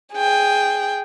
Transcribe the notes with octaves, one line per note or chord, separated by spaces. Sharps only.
G#4 G5